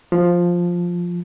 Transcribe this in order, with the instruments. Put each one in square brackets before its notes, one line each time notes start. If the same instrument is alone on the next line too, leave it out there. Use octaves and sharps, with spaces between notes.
[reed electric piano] F3